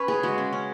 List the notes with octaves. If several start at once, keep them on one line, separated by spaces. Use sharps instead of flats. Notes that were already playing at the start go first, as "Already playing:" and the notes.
Already playing: C#4 B4 C#5
C#3 G#4
G#3 F#4
C#3
C#4